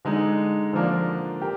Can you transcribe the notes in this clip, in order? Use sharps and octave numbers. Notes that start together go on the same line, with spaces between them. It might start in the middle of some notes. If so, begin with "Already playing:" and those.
D3 G#3 D#4
D3 F3 A#3 D4
G4 A#4